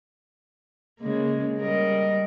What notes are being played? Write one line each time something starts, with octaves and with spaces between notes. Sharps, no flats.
C#3 G#3 A#3
G3 A#4 D#5